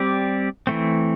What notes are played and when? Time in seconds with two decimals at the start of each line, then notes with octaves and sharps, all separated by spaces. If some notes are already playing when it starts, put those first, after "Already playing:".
Already playing: G3 C4 G4 D5
0.67 E3 A3 C4